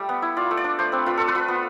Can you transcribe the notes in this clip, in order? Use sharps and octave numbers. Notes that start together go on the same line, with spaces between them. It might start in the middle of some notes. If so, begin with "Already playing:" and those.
Already playing: G3 A3
B3
E4
F4 D5
A3
D5
D4
A3 C5
C4 B4
F4 B4
F4 A4
B4
F4
B3